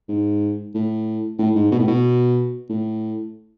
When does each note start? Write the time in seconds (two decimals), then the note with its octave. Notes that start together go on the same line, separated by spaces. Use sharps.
0.08 G#2
0.74 A2
1.39 A2
1.55 G#2
1.71 B2
1.79 A2
1.87 B2
2.69 A2